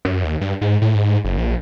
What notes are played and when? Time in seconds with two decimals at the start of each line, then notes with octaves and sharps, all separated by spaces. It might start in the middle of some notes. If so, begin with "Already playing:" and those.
0.05 F#2
0.24 D#2
0.41 G2
0.61 G#2
0.82 A2
0.95 G#2
1.24 F#1
1.38 A#1